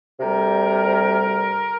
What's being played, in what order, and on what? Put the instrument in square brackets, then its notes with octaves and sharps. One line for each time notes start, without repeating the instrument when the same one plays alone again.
[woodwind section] D2 C3 G3 A#4